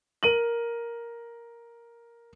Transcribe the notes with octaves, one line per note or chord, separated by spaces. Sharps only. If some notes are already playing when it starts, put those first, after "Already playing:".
A#4 D#7 F#7